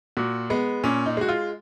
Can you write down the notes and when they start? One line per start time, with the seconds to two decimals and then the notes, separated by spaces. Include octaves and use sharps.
0.17 A#2 F#4
0.50 G#3 B3
0.84 A#2 C#4
1.06 D#4
1.17 G#3 F#4
1.29 F4